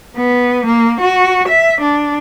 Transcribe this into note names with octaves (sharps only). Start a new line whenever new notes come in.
B3
A#3
F#4
E5
D4